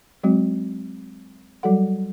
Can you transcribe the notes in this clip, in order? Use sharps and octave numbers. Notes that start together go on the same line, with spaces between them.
F#3 G#3 C4 F#4
F#3 G3 F#4 A4 F#5